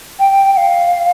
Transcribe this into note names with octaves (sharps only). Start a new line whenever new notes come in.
G5
G5
F5